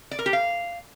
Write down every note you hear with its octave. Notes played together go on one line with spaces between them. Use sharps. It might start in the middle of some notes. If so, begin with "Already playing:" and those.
D5
A#4
G4
F5